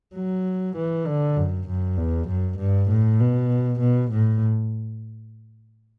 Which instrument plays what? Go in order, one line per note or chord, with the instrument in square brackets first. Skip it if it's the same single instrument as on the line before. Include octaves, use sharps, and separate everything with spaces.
[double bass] F#3
E3
D3
F#2
F#2
E2
F#2
G2
A2
B2
B2
A2